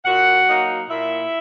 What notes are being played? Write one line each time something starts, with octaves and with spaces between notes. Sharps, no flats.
A#2 F#4 F#5
F#3 A#3 D#4
A#2 E4 E5